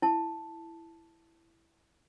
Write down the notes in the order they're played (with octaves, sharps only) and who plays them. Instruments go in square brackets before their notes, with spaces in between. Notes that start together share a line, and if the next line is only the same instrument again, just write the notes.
[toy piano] E4 A5